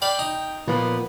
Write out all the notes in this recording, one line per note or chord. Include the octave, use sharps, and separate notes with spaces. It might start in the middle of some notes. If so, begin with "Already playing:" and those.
D5 F5 G5 B5
D#4
A#2 F3 A#3 B3